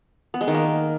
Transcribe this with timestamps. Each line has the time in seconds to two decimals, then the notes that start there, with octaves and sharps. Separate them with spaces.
0.34 B3
0.41 G#3
0.48 D#3
0.54 A#3